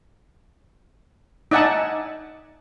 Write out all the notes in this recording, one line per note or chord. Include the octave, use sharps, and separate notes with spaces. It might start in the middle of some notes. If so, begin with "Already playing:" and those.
D#4 D5 E5 F#5 G#5 A5